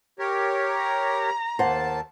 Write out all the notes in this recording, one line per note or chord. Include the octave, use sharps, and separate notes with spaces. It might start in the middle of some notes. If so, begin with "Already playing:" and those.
G4 A#4 C#5
A#5
D#2 A#3 C5 F#5 A5